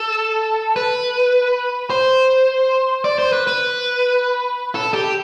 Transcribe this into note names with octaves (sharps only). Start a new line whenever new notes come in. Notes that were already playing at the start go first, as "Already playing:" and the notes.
Already playing: A4
B4
C5
D5
C5
B4
B4
A4
G4